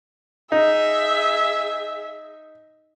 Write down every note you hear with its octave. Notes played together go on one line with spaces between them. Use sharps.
D#4 G#4 E5